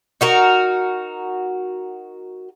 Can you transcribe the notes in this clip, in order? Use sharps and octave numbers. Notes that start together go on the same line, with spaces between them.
D#4 F#4 A#4